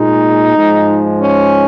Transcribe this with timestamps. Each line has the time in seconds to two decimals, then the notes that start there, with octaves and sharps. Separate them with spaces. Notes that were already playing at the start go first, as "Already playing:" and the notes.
Already playing: A#2 G#3 D#4
0.57 G#2 F3 G#3
1.22 C#4